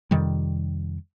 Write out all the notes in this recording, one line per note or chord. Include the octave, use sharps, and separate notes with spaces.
F2 C3 D#3 G3